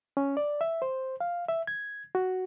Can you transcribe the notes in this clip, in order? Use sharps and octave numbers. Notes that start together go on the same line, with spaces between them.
C#4
D5
E5
C5
F5
E5
G#6
F#4